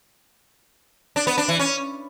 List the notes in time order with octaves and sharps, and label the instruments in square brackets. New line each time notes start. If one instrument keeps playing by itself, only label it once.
[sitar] D4
B3
D4
E3
C#4